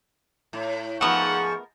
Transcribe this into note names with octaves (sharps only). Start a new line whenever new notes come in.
A2
G#2 F3 A3 B3 A#4 F#5 C#6